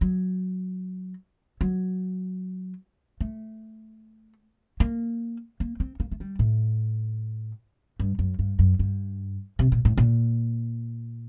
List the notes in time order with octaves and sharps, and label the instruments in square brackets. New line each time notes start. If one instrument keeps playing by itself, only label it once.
[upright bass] F#3
F#3
A3
A#3
A#3
C4
A#3
A3
G3
A2
G2
F#2
G2
F#2
G2
C3
A#2
A2
A#2